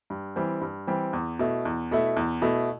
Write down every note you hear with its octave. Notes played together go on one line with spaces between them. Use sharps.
G2
E3 G3 C4
G2
E3 G3 C4
E2
B2 A3 E4
E2
B2 A3 E4
E2
B2 A3 E4